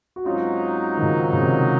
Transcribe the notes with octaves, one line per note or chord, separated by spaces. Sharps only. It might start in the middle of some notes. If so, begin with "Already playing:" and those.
F#4
G#2 F#3 C4 C#4 D#4 F4
D#3
C#3 F3
C#3
C3 D#3